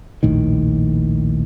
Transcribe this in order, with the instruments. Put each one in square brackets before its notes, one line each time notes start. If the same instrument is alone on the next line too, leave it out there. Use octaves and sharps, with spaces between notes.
[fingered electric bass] A#1 D#2 A2 D#3